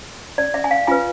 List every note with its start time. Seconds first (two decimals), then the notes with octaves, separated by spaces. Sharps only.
0.38 D5
0.54 E5
0.64 G#5
0.71 F5
0.87 F4 B4 G#5